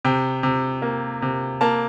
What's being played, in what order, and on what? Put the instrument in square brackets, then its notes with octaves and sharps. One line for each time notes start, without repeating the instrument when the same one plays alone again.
[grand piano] C3 G5
C3
A#3
C3
A#3 A5